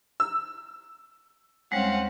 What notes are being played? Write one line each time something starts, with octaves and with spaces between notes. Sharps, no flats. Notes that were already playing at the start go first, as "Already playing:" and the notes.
E6
D#2 G3 G#3 C4 C#4 F5 F#5